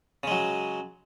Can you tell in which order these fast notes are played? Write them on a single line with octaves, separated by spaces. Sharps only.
C#3 G#3 F#3